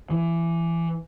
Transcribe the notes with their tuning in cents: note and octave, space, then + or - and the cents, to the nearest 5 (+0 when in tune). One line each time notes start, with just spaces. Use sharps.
E3 +20